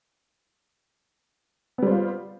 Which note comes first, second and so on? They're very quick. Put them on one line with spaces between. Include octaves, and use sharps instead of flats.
B3 G3 C5 F4